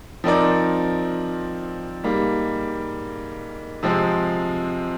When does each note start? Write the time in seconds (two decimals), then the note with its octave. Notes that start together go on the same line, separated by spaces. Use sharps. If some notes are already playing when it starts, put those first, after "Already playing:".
0.24 F3 C4 D#4 A#4 D5
2.04 G#2 G3 A#3
3.83 C3 F3 G#3 C4